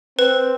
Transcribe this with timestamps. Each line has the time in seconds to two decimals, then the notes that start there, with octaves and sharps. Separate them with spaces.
0.19 C4 B4